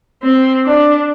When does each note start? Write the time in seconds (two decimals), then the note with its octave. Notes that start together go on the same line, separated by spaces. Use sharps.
0.23 C4
0.65 D4